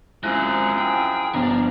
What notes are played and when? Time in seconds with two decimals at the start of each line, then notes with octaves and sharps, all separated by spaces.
0.24 F#2 F3 G#3 C4 E4 G#4 F#6
0.78 G5
1.34 G1 F3 D4 A#5